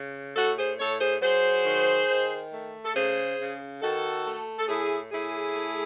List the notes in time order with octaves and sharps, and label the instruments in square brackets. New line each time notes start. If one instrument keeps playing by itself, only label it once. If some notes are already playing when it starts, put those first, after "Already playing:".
Already playing: [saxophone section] C#3
A2 F#4 A4
G#4 C5
A2 A4 C#5
G#4 C5
F#3 G#4 C5
D#3
D#3
A3
A4
C#3 G#4 C5
C#3
D#3 F#4 A4
A3
A4
A2 E4 G#4
A2 E4 G#4
A3